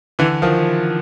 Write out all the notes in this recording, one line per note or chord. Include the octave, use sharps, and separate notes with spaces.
D3 E3
D#3 F3